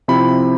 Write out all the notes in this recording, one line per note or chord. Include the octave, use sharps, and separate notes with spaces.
C3 F3 C4 E4 B5